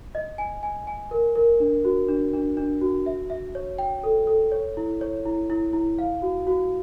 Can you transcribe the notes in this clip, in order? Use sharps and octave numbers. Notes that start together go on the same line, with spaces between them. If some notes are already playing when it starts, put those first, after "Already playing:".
D#5
G#5
G#5
G#5
A#4
A#4
D4
F#4
D4
D4
D4
F#4
E5
E5
C#5
G5
A4
A4
C#5
E4
C#5
E4
E4
E4
F5
F#4
F#4